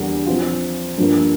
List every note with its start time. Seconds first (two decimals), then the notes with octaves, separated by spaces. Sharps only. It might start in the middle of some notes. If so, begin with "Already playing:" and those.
Already playing: E2 D3 G3 A#3
0.26 F3 C4 F4
0.98 G2 F3 A#3